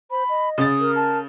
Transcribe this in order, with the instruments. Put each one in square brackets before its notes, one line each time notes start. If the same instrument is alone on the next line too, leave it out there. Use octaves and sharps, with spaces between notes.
[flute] C5 [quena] B5
[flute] D#5
[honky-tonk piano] C#3 A6 [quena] D#6
[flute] A#4
[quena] A5